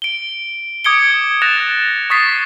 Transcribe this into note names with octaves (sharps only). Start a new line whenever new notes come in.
D7 G7
D6 D#6 G#6 C#7 D7 G7
F#6 A6 A#6 E7 F7
C#6 D#6 A6 B6 C7